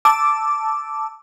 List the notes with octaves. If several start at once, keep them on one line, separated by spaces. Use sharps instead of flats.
A5 D6 E6